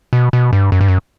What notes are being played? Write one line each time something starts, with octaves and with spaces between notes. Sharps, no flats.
B2
B2
G2
F#2
G2
F#2